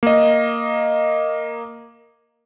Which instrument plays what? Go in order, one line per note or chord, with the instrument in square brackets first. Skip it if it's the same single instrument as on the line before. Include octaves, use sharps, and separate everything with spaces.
[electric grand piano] A#3 D#5